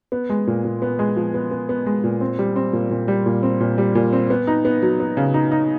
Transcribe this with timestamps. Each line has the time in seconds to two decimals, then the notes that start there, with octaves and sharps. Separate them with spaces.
0.12 B3
0.30 G#3
0.47 A#2
0.65 A#2
0.82 B3
0.99 G#3
1.16 F3
1.34 B3
1.51 B3
1.69 B3
1.86 G#3
2.04 A#2
2.21 C4
2.39 G3
2.56 C4
2.73 A#2
2.91 A#2
3.08 G3
3.26 A#2
3.43 C4
3.60 A#2
3.78 G3
3.95 A#2
4.13 C4
4.30 B3
4.47 D#4
4.65 B3
4.82 F#3
5.00 B3
5.17 C#3
5.34 D#4
5.52 D#4